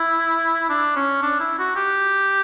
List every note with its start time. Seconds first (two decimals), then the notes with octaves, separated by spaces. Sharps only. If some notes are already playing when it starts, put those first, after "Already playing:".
Already playing: E4
0.69 D4
0.96 C#4
1.22 D4
1.40 E4
1.59 F#4
1.76 G4